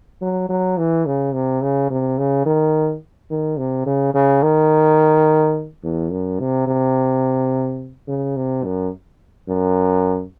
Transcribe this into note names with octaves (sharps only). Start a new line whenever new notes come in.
F#3
F#3
E3
C#3
C3
C#3
C3
C#3
D#3
D#3
C3
C#3
C#3
D#3
E2
F#2
C3
C3
C#3
C3
F#2
F#2